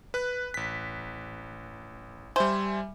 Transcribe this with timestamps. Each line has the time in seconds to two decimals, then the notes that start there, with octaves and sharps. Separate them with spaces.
0.14 B4 F#6
0.54 A1 B6
2.36 G3 C5 E5 G#5